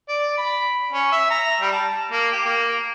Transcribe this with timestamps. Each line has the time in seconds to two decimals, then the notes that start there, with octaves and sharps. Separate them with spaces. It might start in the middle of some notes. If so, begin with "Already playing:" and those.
0.09 D5
0.38 B5
0.93 C#4
1.12 E5
1.30 A#5
1.61 G3
1.73 A5
2.12 A#3
2.32 G4
2.45 A#3